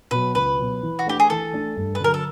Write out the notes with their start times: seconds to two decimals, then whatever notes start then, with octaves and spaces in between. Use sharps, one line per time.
0.11 B2 F#3 B4
0.35 C#2 B4
0.58 B2 F#3
0.83 E3
0.99 F#4
1.06 A3 D4 G4
1.20 G#4
1.30 E3 A4
1.53 A3 D4
1.76 G2
1.95 B4
2.00 D3 F#3 A#4
2.14 A4